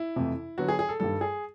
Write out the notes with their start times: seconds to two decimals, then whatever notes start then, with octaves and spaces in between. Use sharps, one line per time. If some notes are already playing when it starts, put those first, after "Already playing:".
Already playing: E4
0.16 F2 C3 E3 A3
0.58 D3 F#3 B3 F#4
0.68 G#4
0.79 G#4
0.89 A4
1.00 G2 D#3 G3 A4
1.21 G#4